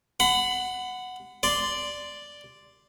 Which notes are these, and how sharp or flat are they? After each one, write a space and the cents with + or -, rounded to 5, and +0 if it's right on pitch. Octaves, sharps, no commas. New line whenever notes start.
F#5 +0 B5 +35
D5 +0 C6 -10